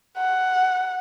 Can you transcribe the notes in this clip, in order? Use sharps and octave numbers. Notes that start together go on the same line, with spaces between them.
F#5